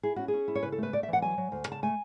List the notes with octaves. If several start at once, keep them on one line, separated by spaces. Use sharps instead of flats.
E4 G#4
C#4 F#4
G#4
C#4
E4
C#5
C#3 B4
A4
A3 B4
A3 D5
E5
E3 F#5
F#3 G#5
F#3
D2
C#3 A5
A3 G#5